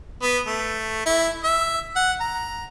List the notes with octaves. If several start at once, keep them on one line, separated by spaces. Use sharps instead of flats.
B3
A3
E4
E5
F#5
A#5